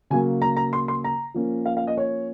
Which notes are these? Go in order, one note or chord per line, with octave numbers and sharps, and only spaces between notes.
C#3 F#3 A#3 G#5
A#5
A#5
C6
C6
A#5
F3 A#3 C#4
F5
F5
D#5
C#5